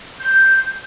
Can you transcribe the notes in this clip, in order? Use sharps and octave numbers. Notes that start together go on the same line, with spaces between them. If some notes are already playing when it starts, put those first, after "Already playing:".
G6